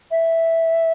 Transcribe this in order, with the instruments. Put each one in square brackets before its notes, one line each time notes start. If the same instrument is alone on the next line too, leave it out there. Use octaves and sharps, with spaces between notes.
[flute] E5